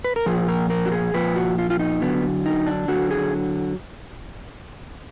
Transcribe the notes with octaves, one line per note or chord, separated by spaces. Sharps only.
B4
A#4
A#2 F3 G#4
A#4
A#4
F#4
G#4
A#2 F3 B4
F#4
F4
F4
D#4
D3 F#3 B3
D#4
D4
D3 F#3 F#4
G#4